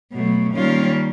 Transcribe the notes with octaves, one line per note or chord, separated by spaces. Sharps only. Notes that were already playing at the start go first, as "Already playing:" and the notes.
B2 F#3 A3
D#3 G3 A#3 C#4 F4